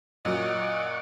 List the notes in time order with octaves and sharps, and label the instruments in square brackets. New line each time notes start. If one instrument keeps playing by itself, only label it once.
[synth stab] F#2 F#3 [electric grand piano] A#2 [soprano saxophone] D#5 [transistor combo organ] F#5 C#6 D6